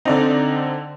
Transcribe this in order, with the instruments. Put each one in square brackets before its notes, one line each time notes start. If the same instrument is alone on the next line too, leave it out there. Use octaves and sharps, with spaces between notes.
[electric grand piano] D3 C4 [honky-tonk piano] D#4 D5